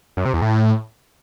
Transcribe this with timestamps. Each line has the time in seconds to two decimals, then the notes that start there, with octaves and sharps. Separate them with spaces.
0.17 F#2
0.25 C3
0.33 E2
0.42 A2